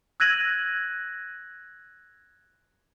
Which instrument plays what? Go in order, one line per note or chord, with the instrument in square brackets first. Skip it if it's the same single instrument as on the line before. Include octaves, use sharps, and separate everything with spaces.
[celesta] E6 F#6 G#6 A#6 D#7 F#7